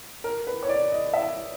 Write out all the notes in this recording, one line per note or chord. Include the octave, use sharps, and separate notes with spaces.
A#4
B4
C#5
D5
D#5
E5